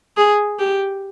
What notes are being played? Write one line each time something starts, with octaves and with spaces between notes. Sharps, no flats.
G#4
G4